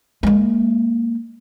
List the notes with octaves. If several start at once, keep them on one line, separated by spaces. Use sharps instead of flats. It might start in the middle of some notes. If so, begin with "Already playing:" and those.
G#3 A#3